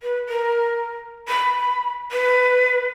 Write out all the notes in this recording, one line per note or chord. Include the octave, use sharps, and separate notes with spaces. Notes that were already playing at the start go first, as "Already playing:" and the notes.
B4
A#4
B5
B4